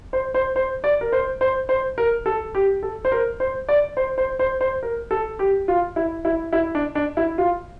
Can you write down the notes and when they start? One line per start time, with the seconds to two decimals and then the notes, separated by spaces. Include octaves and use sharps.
0.13 C5
0.34 C5
0.56 C5
0.84 D5
1.01 A#4
1.12 C5
1.41 C5
1.69 C5
1.98 A#4
2.26 A4
2.55 G4
2.83 A4
3.05 C5
3.12 A#4
3.40 C5
3.69 D5
3.97 C5
4.18 C5
4.39 C5
4.61 C5
4.83 A#4
5.11 A4
5.39 G4
5.68 F4
5.96 E4
6.25 E4
6.53 E4
6.75 D4
6.95 D4
7.17 E4
7.38 F4